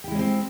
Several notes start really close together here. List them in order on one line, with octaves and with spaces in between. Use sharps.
G4 E4 G#3 C#4 C4